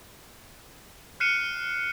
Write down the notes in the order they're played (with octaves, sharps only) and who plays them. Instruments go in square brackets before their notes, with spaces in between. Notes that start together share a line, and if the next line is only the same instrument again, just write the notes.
[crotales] F6 F#6 C7 C#7 D#7 E7